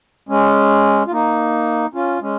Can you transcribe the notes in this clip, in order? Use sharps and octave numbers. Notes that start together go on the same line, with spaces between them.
G#3 C#4
F4
A#3 D#4
C#4 F4
G#3 C#4